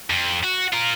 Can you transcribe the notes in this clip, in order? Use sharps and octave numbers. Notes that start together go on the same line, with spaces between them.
F2
F#4
F4 A#4